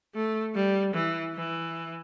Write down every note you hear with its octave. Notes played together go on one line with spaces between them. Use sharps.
A3
G3
E3
E3